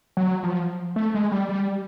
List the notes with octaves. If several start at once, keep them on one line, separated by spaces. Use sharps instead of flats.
F#3
F3
A3
G#3
G3
G3